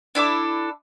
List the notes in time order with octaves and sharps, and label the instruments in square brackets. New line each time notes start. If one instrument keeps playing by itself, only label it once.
[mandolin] D4 E4 A4 D6